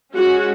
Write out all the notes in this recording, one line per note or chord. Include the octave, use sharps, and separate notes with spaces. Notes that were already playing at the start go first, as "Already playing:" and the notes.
G#3 C#4 F#4